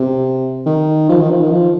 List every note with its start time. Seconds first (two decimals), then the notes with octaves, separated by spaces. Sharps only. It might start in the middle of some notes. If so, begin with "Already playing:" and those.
Already playing: C3
0.66 D#3
1.09 F3
1.20 D#3
1.31 F3
1.42 D#3
1.51 F3